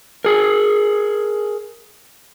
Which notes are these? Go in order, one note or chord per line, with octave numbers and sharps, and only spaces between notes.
G#4 A#4